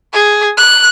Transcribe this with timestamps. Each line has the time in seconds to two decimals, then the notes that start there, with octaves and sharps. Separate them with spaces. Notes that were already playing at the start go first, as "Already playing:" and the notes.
0.13 G#4
0.57 F#6